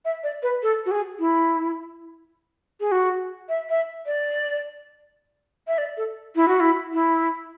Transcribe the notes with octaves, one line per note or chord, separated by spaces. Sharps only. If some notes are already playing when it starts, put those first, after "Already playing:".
E5
D5
B4
A4
F#4
G#4
E4
G#4
F#4
E5
E5
D5
E5
D5
A4
E4
F#4
E4
E4